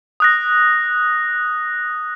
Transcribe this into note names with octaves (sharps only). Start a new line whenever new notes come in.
D#6 F#6 A#6